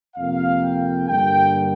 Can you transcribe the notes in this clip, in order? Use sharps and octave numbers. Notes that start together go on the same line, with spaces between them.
F2 C3 A#3 F5
G5
G2 D3 A#3 G5